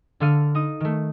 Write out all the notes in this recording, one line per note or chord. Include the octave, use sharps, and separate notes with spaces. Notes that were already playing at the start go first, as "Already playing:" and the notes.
D3 D4 A4 F5 F6 D#7
D#4 D#6
D#3 A3